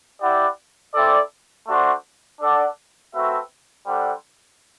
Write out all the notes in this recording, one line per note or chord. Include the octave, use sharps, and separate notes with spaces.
E4 G4 D5 F#5
C4 E4 A4 D5
A3 D4 F#4 C5
D4 A4 D5 F#5
A3 C4 F#4 B4 E5
G3 D4 A4 C5 F#5